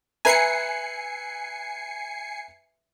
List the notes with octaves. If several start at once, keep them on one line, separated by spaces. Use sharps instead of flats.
B4 E5 G#5 A#5 C7 C#7